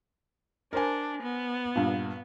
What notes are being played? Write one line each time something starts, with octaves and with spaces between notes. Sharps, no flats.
D4 A#4 C5 G#5
B3
G2 A#2